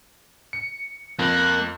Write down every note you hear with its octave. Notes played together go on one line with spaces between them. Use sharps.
C#7
F2 A#3 F#6